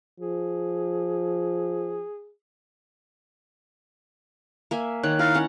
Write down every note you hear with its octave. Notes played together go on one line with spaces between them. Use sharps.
F3 G#4
A#3 E5 G#5
D#3 C#5 F#6
D#4 E4 A#4 F5
C#4 F#5